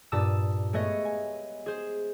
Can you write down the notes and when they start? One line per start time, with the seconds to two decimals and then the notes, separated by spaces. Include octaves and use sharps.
0.12 G2 A#2 A5 D#6 E6 E7
0.73 G#3 A3 B3 C#5 D#5
1.05 G#5
1.66 G#4 C5